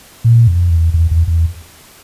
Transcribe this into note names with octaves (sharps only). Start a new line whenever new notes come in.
A#2
F2
E2
E2
E2
E2